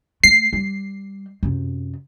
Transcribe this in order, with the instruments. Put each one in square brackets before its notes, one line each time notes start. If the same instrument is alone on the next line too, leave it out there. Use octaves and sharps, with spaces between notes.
[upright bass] A3 [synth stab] C7
[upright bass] G3
F#2 C3